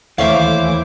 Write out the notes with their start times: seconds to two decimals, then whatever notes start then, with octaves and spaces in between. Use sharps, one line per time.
0.18 D#2 E3 A3 C5 C#5 E5 F5 D6